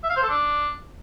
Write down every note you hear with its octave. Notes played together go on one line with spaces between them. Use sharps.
E5
F5
C5
A4
D4